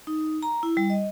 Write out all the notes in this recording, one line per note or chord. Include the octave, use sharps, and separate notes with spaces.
D#4
A#5
E4
G3
D#5